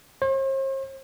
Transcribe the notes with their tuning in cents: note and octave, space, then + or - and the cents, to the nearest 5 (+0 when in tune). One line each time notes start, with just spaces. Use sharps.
C5 +45